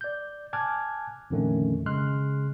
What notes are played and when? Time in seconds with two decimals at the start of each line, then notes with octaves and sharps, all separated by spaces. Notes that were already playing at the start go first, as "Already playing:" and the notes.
0.01 D5 G6
0.53 G#5 A5 D6 F6 F#6 G#6
1.30 F2 A#2 D3 D#3 A3 C#4
1.86 C#3 G#3 C6 F6 F#6